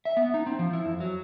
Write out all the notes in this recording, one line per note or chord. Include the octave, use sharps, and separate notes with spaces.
E5
B3
D#4
C4
F3
E4
F2
F#3